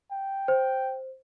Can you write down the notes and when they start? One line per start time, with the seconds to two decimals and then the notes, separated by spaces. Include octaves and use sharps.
0.12 G5
0.48 C5